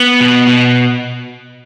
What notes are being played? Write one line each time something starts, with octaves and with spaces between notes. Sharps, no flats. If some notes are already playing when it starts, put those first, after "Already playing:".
Already playing: B3
B2
B2